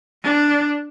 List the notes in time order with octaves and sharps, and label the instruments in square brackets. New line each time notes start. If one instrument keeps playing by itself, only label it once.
[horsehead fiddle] D4